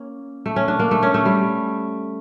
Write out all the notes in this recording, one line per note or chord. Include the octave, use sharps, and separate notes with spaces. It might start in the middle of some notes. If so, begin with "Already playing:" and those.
Already playing: A#3 C#4
A3
C#4
D4
A#3
A3
C#4
A3
G3